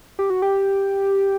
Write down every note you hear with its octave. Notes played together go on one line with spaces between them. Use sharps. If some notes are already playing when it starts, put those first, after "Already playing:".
G4
F#4
G4